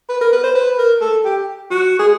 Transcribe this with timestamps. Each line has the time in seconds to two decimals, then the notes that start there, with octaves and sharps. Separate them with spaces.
0.09 B4
0.21 A#4
0.33 B4
0.44 C5
0.55 B4
0.78 A#4
1.01 A4
1.25 G4
1.71 F#4
1.99 G#4